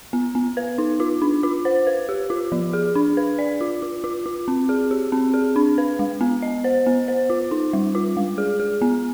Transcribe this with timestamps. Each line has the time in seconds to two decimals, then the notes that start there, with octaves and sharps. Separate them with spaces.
0.13 B3
0.35 B3
0.57 B4
0.78 D#4
1.00 F4
1.22 D4
1.43 F4
1.65 C5
1.87 B4
2.09 G4
2.30 F4
2.52 F3
2.73 G#4
2.95 D4
3.17 B4
3.39 D5
3.61 F4
3.82 F4
4.04 F4
4.26 F4
4.48 C4
4.69 G#4
4.91 G4
5.12 C4
5.34 G#4
5.56 D4
5.78 B4
5.99 G#3
6.21 B3
6.42 D#5
6.64 C5
6.86 B3
7.08 C5
7.30 F4
7.51 D#4
7.73 G3
7.95 F4
8.17 G#3
8.38 G#4
8.60 G#4
8.82 B3